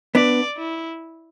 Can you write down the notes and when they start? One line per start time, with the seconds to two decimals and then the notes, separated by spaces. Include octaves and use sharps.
0.15 B3 D4 D5
0.57 E4